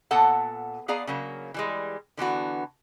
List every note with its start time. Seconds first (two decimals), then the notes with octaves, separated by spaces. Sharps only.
0.11 A#2 B3 A4 F#5 A5
0.88 B3 G#4 D5 F5 A#5
1.07 C#3 F#3 A#3
1.54 E3 G3 G#3
2.17 D3 E3 B3 F#4